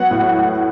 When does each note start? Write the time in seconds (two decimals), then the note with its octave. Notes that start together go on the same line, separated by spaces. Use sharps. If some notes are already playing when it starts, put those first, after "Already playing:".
Already playing: F#3 B3 F#4 F#5
0.11 A2